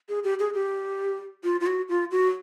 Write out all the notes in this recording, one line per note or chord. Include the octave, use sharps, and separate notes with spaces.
G#4
G4
G#4
G4
F4
F4
F#4
F4
F#4